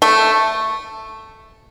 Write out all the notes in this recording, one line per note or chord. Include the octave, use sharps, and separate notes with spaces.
A3